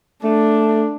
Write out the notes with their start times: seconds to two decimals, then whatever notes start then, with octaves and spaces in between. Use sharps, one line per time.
0.24 A3 D4